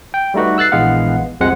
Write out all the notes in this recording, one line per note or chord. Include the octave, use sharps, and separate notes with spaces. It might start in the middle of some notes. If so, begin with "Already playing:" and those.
G5
G3 A3 D#4 F#4 B4
E6 F#6 A6 C7
A#1 E3 G#3 B3 F5 F#5
C2 F2 C3 F3 G#3 F#5